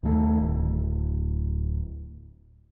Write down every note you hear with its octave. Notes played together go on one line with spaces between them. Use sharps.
D#2 D#3 A3
D1